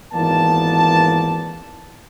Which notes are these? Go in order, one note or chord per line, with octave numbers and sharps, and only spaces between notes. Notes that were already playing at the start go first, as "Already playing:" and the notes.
G#1 E3 A#3 B3 D5 A5